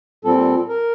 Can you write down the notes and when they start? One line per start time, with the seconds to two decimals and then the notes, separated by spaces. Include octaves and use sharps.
0.24 A#2 G3 C4 A4
0.69 A#4